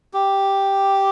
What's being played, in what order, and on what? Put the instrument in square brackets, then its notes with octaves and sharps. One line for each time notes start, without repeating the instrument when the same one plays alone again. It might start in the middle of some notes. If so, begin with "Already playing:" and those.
[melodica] G4